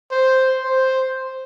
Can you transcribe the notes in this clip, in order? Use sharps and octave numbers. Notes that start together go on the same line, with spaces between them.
C5
C5